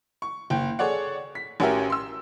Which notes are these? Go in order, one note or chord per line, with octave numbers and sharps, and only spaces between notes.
C#6
F#1 G5
G#4 A4 C#5 D5 F#5
B6
A1 C#4 F#4 G4 A#4 E5
C6 E6